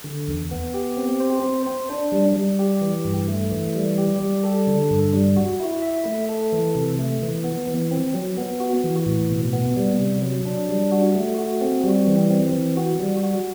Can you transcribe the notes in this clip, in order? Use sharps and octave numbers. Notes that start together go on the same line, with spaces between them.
D3
E2
B3
G4
C4
C5
C4
C5
D4
G3
G3
G4
E3
G2
A3
E3
G3
G4
G3
A4
D3
G2
G3
F#4
E4
E5
A3
A4
E3
C3
A3
E3
B3
E3
C4
F#3
B3
F#4
E3
A2
B2
B3
G3
C3
F#3
D4
G3
F#4
A3
F#4
C4
G3
E3
C4
E3
F#4
G3
F#4